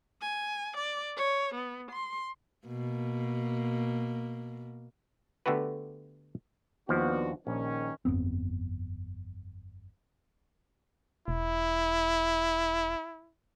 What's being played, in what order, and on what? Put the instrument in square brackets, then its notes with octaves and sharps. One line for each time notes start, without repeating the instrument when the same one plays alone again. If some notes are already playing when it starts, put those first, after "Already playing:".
[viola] G#5
D5
C#5
B3
C6
[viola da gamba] B2 A#3
[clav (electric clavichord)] D3 A3 B3 F#4 G4 B4
[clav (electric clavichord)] D#2 F3 [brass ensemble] B3 D4 F#4
[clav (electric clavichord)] A#1 [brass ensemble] D#3 C#4
[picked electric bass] G1 F2 B3 C4
[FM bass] E1 [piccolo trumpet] E4